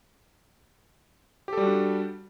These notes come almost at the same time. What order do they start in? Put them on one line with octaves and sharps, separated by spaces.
G4 A4 G3 F#4 D4